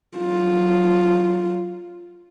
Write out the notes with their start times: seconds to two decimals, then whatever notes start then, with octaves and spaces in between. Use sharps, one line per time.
0.18 F#3 F4